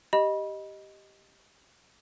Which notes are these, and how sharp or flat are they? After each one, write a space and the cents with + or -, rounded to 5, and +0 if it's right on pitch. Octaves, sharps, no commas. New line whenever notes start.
G4 +0 D#5 +0 B5 -25